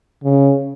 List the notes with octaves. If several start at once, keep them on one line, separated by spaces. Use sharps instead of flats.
C#3